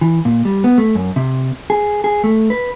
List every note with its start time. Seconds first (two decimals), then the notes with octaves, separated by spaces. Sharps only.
0.01 E3
0.25 A#2
0.45 G3
0.64 B3
0.78 A3
0.95 F#2
1.16 C3
1.70 G#4
2.04 G#4
2.24 A3
2.50 B4